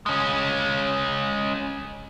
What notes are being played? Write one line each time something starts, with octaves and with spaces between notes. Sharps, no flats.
G#3 C#4